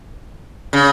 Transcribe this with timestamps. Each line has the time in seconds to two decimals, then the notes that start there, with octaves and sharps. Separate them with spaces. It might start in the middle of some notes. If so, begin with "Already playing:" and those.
0.73 C#3